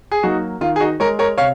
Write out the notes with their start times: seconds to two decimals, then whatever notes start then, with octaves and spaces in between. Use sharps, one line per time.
0.12 G#4
0.23 F#3 A#3 D#4 F#4
0.61 D#3 F4
0.76 G#4
0.80 D#4 F#4
1.00 G#3 A#4 C#5
1.19 A#4 C#5
1.38 C3 C#5 F5